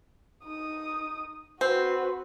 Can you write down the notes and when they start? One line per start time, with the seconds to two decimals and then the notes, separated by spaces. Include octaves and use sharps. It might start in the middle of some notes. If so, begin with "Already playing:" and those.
0.44 D#4 D#6
1.61 C4 F#4 B4